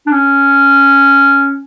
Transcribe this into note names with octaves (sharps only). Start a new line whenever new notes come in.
D4
C#4